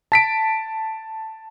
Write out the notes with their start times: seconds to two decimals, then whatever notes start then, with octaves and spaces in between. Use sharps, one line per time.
0.12 A5 B6 D7